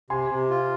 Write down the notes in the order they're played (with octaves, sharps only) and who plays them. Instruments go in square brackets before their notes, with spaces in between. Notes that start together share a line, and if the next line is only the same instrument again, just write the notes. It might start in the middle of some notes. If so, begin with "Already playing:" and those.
[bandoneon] C3 [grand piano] G#5 C6
[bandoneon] C3
F4